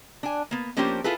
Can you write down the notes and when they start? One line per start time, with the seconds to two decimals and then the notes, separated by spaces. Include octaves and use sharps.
0.23 D4 G#5
0.51 A#3 B3
0.77 F3 A#3 C#4 D4 G4 C5
1.04 E4 F4 G#4 A4 B4